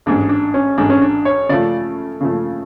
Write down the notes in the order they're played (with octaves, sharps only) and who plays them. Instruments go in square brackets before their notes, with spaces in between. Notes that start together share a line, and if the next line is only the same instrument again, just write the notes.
[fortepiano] A1 G#2 G#3 [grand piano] D4
[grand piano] D4
C#4
[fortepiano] A1 G#2 G#3 [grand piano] D4
[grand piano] C#4
D4
C#5
[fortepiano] C#3 F3 A3 [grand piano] D5
[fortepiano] C#3 F3 A3